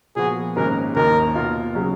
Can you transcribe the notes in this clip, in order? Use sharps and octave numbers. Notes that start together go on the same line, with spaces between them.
A#2 F3 B3 F#4 G#4
G#1 G#2 D#3 A#3 C#4 A#4
D#2 D#3 A#3 D#4 A#4
B2 A#3 F4
C#3 F#3 C#4